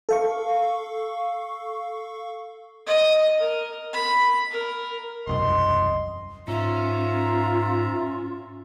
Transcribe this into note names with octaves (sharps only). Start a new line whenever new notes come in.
A4 F5 C#6
D#5
A#4
B5
A#4
E1 C2 F#2 D#5 C6
G#2 C#4 F4 E5 A#5